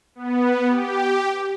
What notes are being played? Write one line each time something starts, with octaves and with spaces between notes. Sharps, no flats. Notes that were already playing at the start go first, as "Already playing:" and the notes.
B3
G4